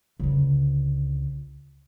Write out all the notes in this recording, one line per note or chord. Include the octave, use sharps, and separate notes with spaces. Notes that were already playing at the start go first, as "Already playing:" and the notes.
C#2 D3